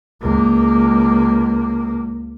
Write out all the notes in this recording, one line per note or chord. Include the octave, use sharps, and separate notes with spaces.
C#2 A#3